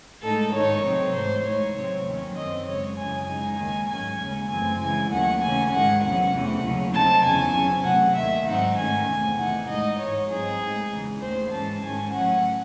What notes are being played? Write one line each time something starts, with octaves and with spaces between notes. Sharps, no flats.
A2 G#3 D#4 A4
G#2 D#3 G#3 D#4 C#5
C3 F#3 C4 D#4
G#2 E3 A3 C5
A2 G#3 D#4 C#5
C3 F#3 C4
D#2 D#3 F#3 C#4
F#2 D#3 F#3 C4 D#5
F#2 C#3 G#3 C#5
F#2 C#3 E3 G#3 G#5
C#3 G#3 D#4 G#5
D#2 D#3 G#3 G#5
G#2 F#3 C#4 G#5
D#2 C#3 G#3 C#4
F#2 E3 A3 C4 G#5
C#3 E3 G#3 G#5
D#2 D#3 F#3 A3 C#4 F#5
C#3 E3 A3 C#4 G#5
G#2 D#3 G#3 F#5
E2 C3 F#3 C#4 F#5
E2 C3 E3 A3 C#4
D#2 C#3 F#3 C#4
C3 F#3 C4 D#4 A5
E2 C#3 F#3 C#4 G#5
C3 F#3 C#4
E2 C3 F#3 A3 F#5
D#2 D#3 A3 E5
G#2 F#3 C4 D#4 F#5
G#2 D#3 A3 C#4 G#5
E2 C3 D#3 A3
C3 E3 A3 D#4 F#5
A2 G#3 D#4 D#5
G#2 E3 G#3 C#5
G#2 F#3 C4 D#4 G#4
A2 G#3 D#4
E2 C#3 E3 G#3
D#2 D#3 A3 C#4 C5
G#2 E3 G#3 C#4 A5
G#2 D#3 G#3 C#4 G#5
A2 F#3 C#4 F#5